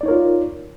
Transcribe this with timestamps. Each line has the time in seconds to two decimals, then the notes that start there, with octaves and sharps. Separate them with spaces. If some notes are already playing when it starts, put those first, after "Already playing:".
0.01 D5
0.03 D#4
0.06 C#5
0.08 A#4
0.11 F4